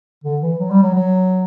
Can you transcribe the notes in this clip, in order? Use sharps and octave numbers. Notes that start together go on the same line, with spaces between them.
D3
E3
F#3
G3
F#3
F#3